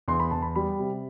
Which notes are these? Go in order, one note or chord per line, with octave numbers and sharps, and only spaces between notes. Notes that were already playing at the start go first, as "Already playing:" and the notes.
E2 C6
B5
E2 A5
B5
G3 B5
C3